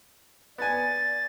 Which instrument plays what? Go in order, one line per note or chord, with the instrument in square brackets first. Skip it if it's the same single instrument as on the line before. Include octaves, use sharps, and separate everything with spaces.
[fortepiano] B3 G#5 [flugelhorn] D5 [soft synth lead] A6